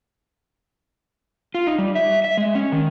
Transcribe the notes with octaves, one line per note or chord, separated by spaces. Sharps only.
F4
D#4
G3
E5
E5
G#3
C#4
D#3